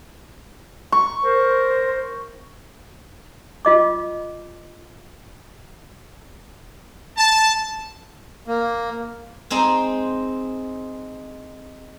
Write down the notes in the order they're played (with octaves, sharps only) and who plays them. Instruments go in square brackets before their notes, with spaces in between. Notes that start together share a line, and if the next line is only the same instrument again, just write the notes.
[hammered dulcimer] C#6
[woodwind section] A#4 C5
[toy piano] F4 D#5 D6
[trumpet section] A5
[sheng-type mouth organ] A#3
[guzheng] G#3 C4 D#4 C5